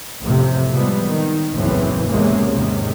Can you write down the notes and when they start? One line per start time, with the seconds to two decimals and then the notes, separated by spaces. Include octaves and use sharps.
0.22 A1 F2 C3
0.72 C3 F3 G3 G#3 B3
1.05 D#3
1.53 F#1 B1 E2 A2 E3 C4
2.08 A1 E2 C3 G#3 A#3 C#4
2.52 E2 G#2 C3 D#3